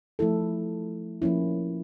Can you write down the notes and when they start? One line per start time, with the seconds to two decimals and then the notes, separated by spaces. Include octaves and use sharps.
0.19 F3 A3 E4 A4
1.22 F3 A#3 C#4 E4